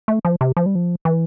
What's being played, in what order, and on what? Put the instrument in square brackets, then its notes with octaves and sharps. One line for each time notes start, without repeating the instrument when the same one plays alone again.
[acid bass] A3
F3
C3
F3
G3
F3
E3